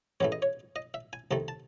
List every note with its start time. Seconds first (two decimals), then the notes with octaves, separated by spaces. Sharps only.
0.20 A1 G#2 E3 A3 C#5
0.32 D#5
0.42 C#5
0.76 D#5
0.94 E5
1.13 G#5
1.31 C2 C3 D#3 A3 A5
1.48 A5